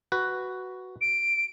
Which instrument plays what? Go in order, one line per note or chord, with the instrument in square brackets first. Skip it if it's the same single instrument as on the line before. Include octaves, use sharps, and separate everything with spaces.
[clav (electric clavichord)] F#4 B4
[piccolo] D7